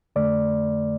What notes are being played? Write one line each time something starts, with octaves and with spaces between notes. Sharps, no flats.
F2 D3 A3 D5